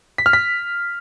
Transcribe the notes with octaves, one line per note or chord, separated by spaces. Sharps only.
B6
F6
B6